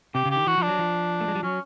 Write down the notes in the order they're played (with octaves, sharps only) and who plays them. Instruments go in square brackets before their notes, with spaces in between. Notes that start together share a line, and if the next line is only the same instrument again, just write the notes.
[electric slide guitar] C3 [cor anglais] G4
[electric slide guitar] C#3
[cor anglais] G4
[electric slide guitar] D#3
[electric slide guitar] E3 [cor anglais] F#4
[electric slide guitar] F3 [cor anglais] D4
[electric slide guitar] F#3
F3
A3
G#3
G3
[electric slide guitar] F#3 [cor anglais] C#4